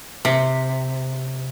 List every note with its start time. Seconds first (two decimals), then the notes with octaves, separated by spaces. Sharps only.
0.25 C3